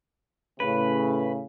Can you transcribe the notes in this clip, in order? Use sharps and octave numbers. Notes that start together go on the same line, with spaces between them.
A2 C#3 B4